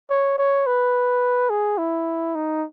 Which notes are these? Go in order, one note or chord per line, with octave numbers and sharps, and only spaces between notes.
C#5
C#5
B4
G#4
E4
D#4